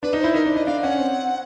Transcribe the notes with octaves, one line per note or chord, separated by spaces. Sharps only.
D4 B4
D#4
E4 C5
D#4 A#4
D4
D4 D#5
D4 F5
C#4 F#5
C4